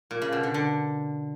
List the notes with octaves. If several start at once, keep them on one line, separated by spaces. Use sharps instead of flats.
A#2
C#3
B2
D3
D3